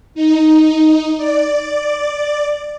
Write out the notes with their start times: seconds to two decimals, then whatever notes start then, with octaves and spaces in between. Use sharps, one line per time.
0.15 D#4
1.17 D5